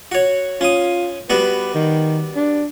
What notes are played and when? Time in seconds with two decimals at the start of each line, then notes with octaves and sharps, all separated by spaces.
0.12 F#4 C#5
0.61 C#4 F4 D#6
1.30 G3 B3 F#4 B4
1.75 D#3
2.36 D4